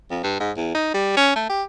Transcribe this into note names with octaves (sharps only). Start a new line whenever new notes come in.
F2
G2
G#2
E2
D#4
G3
C#4
A3
G4